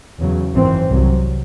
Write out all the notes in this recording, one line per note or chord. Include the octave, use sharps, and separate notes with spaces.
E2 C#3 F#3
G#1 F#2 E3 C4
C2 C3 F#3